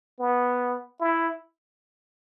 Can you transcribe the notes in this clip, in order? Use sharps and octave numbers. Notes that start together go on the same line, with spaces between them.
B3
E4